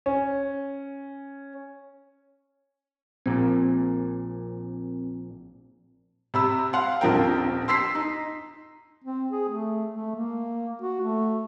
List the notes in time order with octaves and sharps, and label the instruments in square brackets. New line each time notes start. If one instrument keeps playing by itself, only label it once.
[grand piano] C#4
[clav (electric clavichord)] A#1 A#2 [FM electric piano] C4
[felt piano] C3 B5 E6
F5 F#5 C6
D#1 A#1 F3 C4 A#4 G5
C6 E6 B6 C7
D#4
[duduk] C4
G#4
A3
A3
A#3
F#4
A3